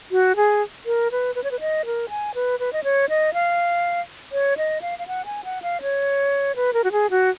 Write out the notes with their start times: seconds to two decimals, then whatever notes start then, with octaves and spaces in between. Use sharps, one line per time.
0.12 F#4
0.36 G#4
0.86 A#4
1.11 B4
1.35 B4
1.44 C#5
1.51 B4
1.60 D#5
1.86 A#4
2.09 G#5
2.35 B4
2.60 B4
2.73 D#5
2.84 C#5
3.09 D#5
3.34 F5
4.32 C#5
4.57 D#5
4.82 F5
4.99 F5
5.07 F#5
5.25 G#5
5.44 F#5
5.62 F5
5.82 C#5
6.56 B4
6.74 A#4
6.84 F#4
6.92 G#4
7.11 F#4